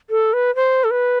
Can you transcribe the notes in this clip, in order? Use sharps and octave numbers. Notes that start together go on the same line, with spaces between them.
A4
B4
C5
A4
B4